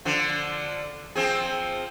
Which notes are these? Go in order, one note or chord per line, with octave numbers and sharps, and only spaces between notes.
D3 F3
F3 C4 G#4